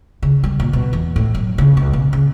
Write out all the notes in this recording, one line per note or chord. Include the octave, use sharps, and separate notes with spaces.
C#3
G3
A#2
B2
E2
A2
F#3
C#3
C#2
B2
C#3